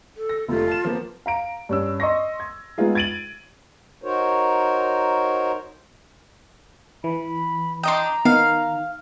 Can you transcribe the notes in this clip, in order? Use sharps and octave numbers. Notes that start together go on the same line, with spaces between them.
A4
A#6
F1 A3 F4
A5 E7
F3 A#3 B3
F5 A#5 D7
G2 C#4 E6
D#5 C6 C#6 A#6
G#6
G#3 B3 D#4 F4 G#4
G#6 A6 D7 D#7 F#7
D#4 F#4 A#4 C5 C#5
E3 B5
D4 D#5 G5 A#5 C6 D#6
D#3 B3 F5